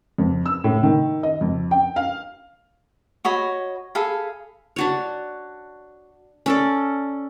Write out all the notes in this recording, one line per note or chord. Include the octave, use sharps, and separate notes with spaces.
F2
E6
A2
D#3
D#5
F2
G5
F5
F#4 C#5 D#5 B5
G#4 A4 F5 B5
D4 F#4 C#5
C#4 A4 D5